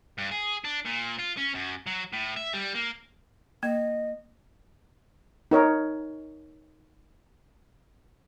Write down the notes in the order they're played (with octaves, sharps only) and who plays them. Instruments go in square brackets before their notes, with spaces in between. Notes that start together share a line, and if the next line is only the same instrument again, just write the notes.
[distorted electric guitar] G2
G#4
D4
A#2
F4
C#4
F#2
F#3
A2
E5
G3
A#3
[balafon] A#3 [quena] D#5
[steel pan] D#4 A#4 C#5